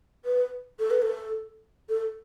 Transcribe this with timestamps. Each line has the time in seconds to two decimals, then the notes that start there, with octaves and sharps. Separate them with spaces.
0.25 B4
0.79 A4
0.91 B4
1.02 A4
1.89 A4